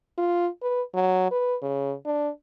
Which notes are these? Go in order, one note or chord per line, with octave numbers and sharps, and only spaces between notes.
F4
B4
F#3
B4
C#3
D4